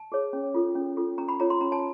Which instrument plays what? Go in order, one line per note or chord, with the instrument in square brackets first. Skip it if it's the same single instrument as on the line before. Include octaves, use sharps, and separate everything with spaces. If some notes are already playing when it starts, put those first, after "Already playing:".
Already playing: [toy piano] A5
G#4 C#5
C#4
F4 A4
C#4
F4 A4
C#4 A#5
B5
F4 A4 C#5 A#5
C6
C#4 A#5
A5